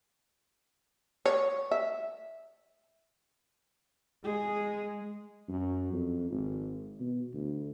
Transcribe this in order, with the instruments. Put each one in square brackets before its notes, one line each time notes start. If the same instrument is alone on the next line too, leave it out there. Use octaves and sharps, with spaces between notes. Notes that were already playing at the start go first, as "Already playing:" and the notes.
[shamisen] C#5
E5
[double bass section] G#3 [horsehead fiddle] G#4
[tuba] F#2
F2
G#1
B2
D2